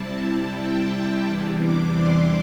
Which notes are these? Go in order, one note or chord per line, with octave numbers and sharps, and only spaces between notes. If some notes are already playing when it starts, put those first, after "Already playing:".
Already playing: C3 G3 C4 E4 A5
G5
E2 C3 E3 G3 D4
D6
C6